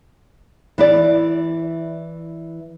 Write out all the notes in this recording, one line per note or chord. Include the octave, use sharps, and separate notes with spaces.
E3 E4 D5